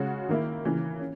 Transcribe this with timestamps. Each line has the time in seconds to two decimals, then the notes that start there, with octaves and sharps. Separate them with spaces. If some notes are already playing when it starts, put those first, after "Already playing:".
Already playing: C#3 G#3 C#4 F#4
0.29 D#3 A#3 E4
0.65 C#3 E3 A#3
1.00 C#4